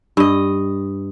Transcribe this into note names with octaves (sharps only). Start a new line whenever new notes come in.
G2 D#5